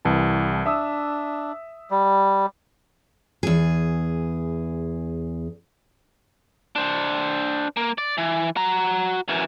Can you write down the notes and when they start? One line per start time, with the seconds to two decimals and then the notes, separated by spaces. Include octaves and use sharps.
0.05 C2 E3 A5
0.66 D4 E5 D#6 E6
1.90 G3
3.43 E2 G#4
6.76 D4 C5
7.77 A#3
7.98 D5
8.18 E3
8.56 F#4 A#5
9.28 F#2 E3